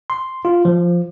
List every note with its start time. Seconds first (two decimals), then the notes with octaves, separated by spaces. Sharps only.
0.10 C6
0.45 F4
0.65 F3